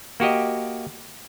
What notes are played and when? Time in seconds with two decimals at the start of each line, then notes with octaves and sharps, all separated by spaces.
0.20 A#3 F#4 G4 D#5